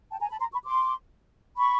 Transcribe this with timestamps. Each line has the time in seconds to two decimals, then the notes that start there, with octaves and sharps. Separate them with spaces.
0.11 G5 A5
0.20 G#5 A#5
0.30 A5 B5
0.39 A#5 C6
0.52 B5 C#6
0.65 C6 D6
1.56 B5 C#6